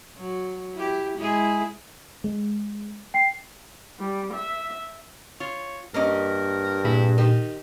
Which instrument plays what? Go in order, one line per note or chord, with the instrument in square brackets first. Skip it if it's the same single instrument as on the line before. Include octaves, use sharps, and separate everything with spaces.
[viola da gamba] F#3
E4 G4
G#3 E4 G#4
[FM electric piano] G#3
[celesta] G5 C7
[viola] G3
E5
[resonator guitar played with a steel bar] F4 [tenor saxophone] C#5
[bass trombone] G2 [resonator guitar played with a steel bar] A#3 C#4 D#5 [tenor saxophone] A#4
[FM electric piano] A#2 G#4 A#6 [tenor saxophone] E4
[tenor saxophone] D#3 [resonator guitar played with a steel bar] G4